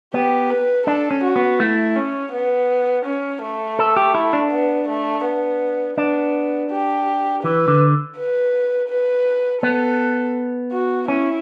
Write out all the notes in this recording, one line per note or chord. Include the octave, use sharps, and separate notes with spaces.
B3 G4
B4
D4 A4
C#4
F#4
B3
A3 E4
C#4
B3
C#4
A3
A4
G4
E4
D4
B3
A3
B3
B3 D4
G4
E3 B4
D3
B4
B4
B3 A4
F#4
C#4 E4